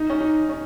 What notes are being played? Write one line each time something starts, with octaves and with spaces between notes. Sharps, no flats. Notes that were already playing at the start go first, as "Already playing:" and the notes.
Already playing: D#4
C#4
D#4
C#4